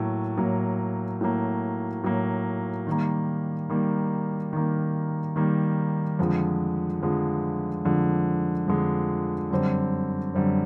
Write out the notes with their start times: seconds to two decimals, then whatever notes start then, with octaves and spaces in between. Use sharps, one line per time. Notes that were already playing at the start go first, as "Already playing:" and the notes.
Already playing: A2 F#3 A#3
0.37 A2 F#3 A#3
1.21 A2 F#3 A#3
2.03 A2 F#3 A#3
2.87 D#3 G3 A#3
3.69 D#3 G3 A#3
4.53 D#3 G3 A#3
5.36 D#3 G3 A#3
6.19 F2 D3 F3 G#3
7.01 F2 D3 F3 G#3
7.85 F2 D3 F3 G#3
8.68 F2 D3 F3 G#3
9.51 F#2 D3 G3 C4
10.34 F#2 D3 G3 C4